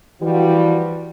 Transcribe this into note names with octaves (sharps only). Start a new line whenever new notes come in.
E3 F3 G3 F#4